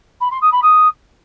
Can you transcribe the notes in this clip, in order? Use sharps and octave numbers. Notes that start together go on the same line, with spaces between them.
B5
C6
D#6
B5
D#6